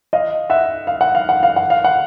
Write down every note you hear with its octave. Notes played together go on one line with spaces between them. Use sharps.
D#5 F5
E5 F#5
F5
F#5
F5
F#5
F5
F#5
F5
F#5